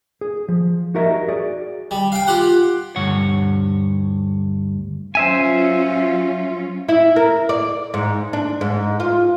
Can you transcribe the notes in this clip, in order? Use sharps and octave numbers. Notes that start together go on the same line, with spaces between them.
G#4
F3
D#4 F#4 G4 A#4 D#5 E5
F#4 G#4 D5
G3
F5 G5
F4 G4 F#5
D2 G2 C#5 F#5
F#3 C#4 F4 C5 E5 G#5
E4
A#4
D5
G#2
D4
G#2
F4